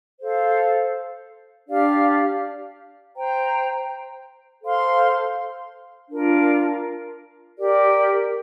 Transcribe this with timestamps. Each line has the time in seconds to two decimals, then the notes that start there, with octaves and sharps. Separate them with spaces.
0.20 A4 C5 F5
1.67 D4 G4 D5 F5
3.15 C5 G5 A#5
4.63 A4 C5 F5 C6
6.10 D4 F4 A#4
7.57 G4 A#4 D5